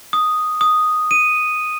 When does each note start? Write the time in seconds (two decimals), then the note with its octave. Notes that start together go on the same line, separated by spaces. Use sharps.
0.13 D#6
0.61 D#6
1.11 D#7